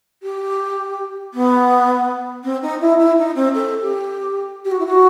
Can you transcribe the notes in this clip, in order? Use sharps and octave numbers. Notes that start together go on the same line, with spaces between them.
G4
B3
C4
D#4
E4
E4
D#4
C4
A4
G4
G4
F#4
E4
F#4